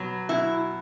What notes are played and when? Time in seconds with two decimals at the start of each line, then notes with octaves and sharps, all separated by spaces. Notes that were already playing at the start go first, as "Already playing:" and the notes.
Already playing: B2 F#3
0.29 B2 E4